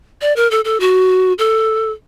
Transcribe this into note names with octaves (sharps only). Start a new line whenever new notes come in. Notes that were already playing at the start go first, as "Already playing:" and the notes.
D5
A#4
A4
A4
F#4
A4